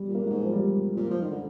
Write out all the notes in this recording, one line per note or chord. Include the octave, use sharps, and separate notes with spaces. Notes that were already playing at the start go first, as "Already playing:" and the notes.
Already playing: G3
A#2
A#3
G#3
G#2
F3
G3
A#2
F3
D#3
D3